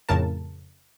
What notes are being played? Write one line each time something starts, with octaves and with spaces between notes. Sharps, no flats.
F2 A2 C#3 A#4 A5